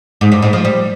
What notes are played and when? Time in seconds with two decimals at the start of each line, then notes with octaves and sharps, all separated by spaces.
0.21 G#2
0.32 G2
0.42 G#2
0.53 F3
0.65 G3